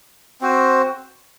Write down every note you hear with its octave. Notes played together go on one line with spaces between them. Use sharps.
C4 F#4 C5